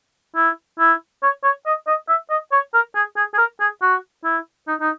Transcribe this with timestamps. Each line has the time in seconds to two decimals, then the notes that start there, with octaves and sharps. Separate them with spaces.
0.36 E4
0.79 E4
1.23 C#5
1.44 C#5
1.66 D#5
1.88 D#5
2.09 E5
2.30 D#5
2.52 C#5
2.74 A#4
2.95 G#4
3.17 G#4
3.34 G#4
3.38 A#4
3.60 G#4
3.82 F#4
4.24 E4
4.68 D#4
4.81 D#4